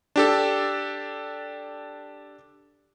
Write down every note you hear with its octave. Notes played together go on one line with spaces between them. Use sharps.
D4 G4 A4